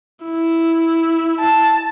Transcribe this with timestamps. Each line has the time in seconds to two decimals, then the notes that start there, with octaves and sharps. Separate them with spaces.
0.24 E4
1.40 A5